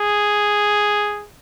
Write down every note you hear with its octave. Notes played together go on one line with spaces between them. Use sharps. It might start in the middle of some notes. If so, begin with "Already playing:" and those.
Already playing: G#4